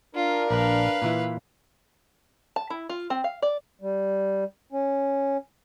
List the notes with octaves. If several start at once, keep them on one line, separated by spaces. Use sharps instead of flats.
D4 F4 A#4
A#1 B4 F5
A#2 E3 E4
A5
E4
F4
C4
F5
D5
G3
C#4